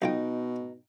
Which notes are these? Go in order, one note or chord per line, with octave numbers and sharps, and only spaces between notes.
B1 B2 D#4 F4 G5